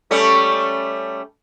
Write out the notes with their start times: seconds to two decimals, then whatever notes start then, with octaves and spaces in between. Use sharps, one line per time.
0.11 G3 A3 C#4